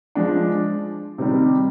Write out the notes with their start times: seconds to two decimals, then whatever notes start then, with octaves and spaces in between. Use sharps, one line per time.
0.15 F3 G#3 D4
1.18 C3 D#3 G3 C4